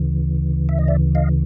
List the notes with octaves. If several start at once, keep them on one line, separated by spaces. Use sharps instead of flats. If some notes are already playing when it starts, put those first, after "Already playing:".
Already playing: D2 C#3 E3
E5
D#5
D5 E5
D#5 F5